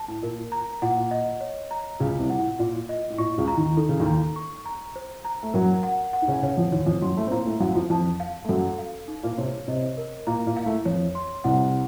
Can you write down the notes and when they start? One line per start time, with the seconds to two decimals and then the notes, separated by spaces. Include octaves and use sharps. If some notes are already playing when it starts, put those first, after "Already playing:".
Already playing: A5
0.08 A2
0.22 A#2 A#4
0.52 A#5
0.82 A#2 F#5
1.11 D#5
1.41 C#5
1.71 A#5
2.00 C#2 C#3 F4
2.19 C2 C3
2.30 F#5
2.39 A2
2.59 A#2 F4
2.89 D#5
3.10 A2
3.18 A#2 C#6
3.38 C#2 C#3
3.48 A#5
3.57 D#2 D#3
3.77 D#3 A4
3.89 C#3
4.00 D#2 D#3
4.06 A#5
4.36 C#6
4.65 A#5
4.96 C5
5.25 A#5
5.43 A3
5.54 F#2 F#3 A#4
5.83 F#5
6.13 F#5
6.22 D#4
6.28 C#3 C#4
6.43 C#3 C#4 C#5
6.57 F2 F3
6.72 D#2 D#3 C#5
6.86 F2 F3
7.01 F#2 F#3 C6
7.17 A2 A3
7.27 C4
7.31 A#2 A#3 A#5
7.46 A2 A3
7.60 F#2 F#3 F5
7.75 F2 F3
7.90 F2 F3 A5
8.20 F5
8.45 A3
8.49 F#2 F#3 A4
8.79 F5
9.08 D#4
9.23 A#2 A#3
9.38 C3 C4 C#5
9.68 C3 C4 D#5
9.98 A#4
10.27 A#2 A#3 A#5
10.47 A#2 A#3
10.57 F5
10.66 A2 A3
10.85 F2 F3 C#5
11.15 C6
11.44 C2 C3 F#5